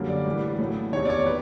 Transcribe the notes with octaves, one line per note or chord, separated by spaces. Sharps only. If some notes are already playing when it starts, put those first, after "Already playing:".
Already playing: F#2 D3 G3 A#3
D5
A2 E3 G3
A2 F#3 A#3
E2 C3 D#3 C#5
D5
C#5
B4